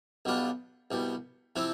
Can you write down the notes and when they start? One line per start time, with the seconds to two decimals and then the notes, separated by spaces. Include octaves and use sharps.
0.25 B1 B2 G3 D4 F4
0.91 C2 B2 G3
1.56 C3 F3 C4 E4